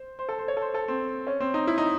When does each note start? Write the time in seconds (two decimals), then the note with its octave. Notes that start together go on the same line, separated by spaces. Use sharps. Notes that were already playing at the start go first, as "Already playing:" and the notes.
Already playing: C5
0.19 C5
0.29 A4
0.39 C5
0.48 C#5
0.57 A4
0.62 C5
0.74 A4
0.88 C4
1.27 C#4
1.40 C4
1.54 D#4
1.67 E4
1.78 D#4